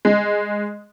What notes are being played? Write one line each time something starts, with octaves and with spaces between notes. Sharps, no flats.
G#3